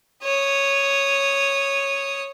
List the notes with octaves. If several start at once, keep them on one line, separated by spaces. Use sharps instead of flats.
C#5 D#6